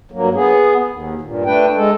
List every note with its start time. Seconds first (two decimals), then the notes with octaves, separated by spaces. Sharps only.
0.12 G2 F#3 A#3
0.35 B3 G#4
0.87 D#2
1.21 G2 A#2
1.46 A3 D4 B4 G5
1.75 G#3 A4